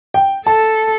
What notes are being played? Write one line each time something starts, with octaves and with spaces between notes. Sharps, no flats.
G5
A4 A5